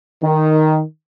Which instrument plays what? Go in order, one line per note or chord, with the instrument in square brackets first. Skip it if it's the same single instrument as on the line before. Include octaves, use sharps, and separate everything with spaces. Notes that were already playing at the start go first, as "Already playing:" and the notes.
[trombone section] D#3